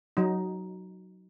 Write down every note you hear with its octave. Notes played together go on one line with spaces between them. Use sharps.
F#3 D#4